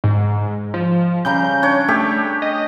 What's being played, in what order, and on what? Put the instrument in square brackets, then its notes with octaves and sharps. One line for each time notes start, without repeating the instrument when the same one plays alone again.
[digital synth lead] G#2
F3
[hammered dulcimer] C#3 G3 A#5 [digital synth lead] G6
[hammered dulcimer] D4 C#5
[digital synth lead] A3 [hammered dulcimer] G4
[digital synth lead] D#5